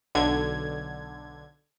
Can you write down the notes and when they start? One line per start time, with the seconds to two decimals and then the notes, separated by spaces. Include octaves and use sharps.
0.15 B1 D3 G#6